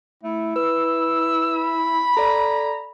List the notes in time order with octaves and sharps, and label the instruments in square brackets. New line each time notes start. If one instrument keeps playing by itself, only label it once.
[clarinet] A3 [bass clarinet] E4
[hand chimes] B4 [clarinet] E6
[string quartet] B5
[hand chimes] A4 D5 [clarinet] A#5